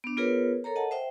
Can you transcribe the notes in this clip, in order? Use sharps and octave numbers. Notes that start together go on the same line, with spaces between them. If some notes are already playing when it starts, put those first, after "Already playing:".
B3 D4
B3 F4 G#4 A#4 B4 C#5
A4 A#4 C#5 A#5
D#5 F#5 A5
C5 E5 G5